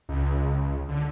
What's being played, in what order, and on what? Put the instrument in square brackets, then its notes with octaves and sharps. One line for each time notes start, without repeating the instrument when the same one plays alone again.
[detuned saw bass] C#2
D3